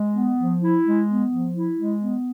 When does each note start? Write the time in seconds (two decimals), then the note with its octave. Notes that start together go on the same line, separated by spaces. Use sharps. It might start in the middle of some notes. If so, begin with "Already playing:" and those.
Already playing: G#3
0.14 B3
0.38 F3
0.61 E4
0.84 G#3
1.08 B3
1.30 F3
1.54 E4
1.76 G#3
2.01 B3